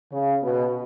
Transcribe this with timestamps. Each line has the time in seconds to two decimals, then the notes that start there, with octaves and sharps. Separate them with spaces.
0.12 C#3
0.43 B2